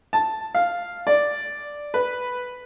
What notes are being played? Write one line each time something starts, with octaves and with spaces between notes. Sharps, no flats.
A5
F5
D5
B4